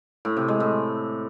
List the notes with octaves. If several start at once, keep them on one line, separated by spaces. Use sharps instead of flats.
A2
C3
G#3
A2